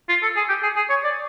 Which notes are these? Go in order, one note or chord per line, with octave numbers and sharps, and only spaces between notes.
F4
A4
G#4
G4
G#4
G#4
C#5
D5